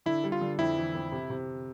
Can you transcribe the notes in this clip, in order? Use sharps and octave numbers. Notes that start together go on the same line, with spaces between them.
D3 E4
G3
F4
D3
F2 E4
E3
F2
C3
C3